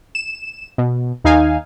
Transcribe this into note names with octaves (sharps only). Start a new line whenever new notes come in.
E7
B2
D#2 D#4 F5 G#5